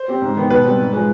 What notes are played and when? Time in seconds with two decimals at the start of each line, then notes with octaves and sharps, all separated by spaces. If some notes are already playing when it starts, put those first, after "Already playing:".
Already playing: C5
0.08 C4 G4
0.22 G#2
0.36 D#3 B3
0.50 B2 B4
0.65 G3 C4
0.79 G#2
0.93 F3 G#3